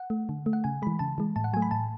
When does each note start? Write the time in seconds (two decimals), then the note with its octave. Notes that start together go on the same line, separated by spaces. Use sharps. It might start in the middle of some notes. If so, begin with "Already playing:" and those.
Already playing: F#5
0.10 A3
0.29 D3
0.46 A3
0.53 F#5
0.64 C#3 G#5
0.82 E3 G#3 B5
0.99 C#3 A5
1.18 E3 G#3
1.36 A2 A5
1.44 F#5
1.53 F#3 A3 G#5
1.62 B5
1.71 A2 A5